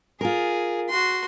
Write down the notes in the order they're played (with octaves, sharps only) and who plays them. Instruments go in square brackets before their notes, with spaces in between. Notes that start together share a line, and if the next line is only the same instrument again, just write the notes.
[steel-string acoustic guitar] F4 A#4 [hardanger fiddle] G#4
[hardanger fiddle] F#4 C6